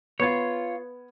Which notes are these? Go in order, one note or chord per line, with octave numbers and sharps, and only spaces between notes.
B3 F4 C#5 G#6